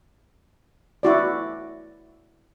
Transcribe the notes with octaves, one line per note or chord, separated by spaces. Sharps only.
E4 F#4 D5